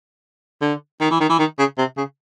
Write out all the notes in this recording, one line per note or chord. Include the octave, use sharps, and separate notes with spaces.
D3
D#3
E3
D#3
E3
D#3
C#3
C3
C#3